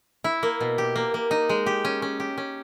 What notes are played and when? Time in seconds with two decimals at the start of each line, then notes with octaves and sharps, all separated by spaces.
0.24 E4
0.43 A#3
0.60 B2
0.78 G4
0.96 A#3
1.14 A#3
1.31 D#4
1.49 G#3
1.66 G4
1.85 C#4
2.02 C#4
2.20 G4
2.38 C#4